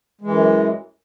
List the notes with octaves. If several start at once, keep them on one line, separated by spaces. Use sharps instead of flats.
F#2 E3 G#3